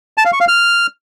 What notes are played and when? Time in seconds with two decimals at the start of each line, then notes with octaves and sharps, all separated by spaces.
0.18 A5
0.25 F5
0.33 C#6
0.40 F5
0.48 F6